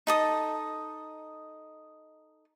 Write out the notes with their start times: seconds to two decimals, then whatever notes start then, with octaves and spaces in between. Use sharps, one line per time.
0.07 D#4 A4 D#6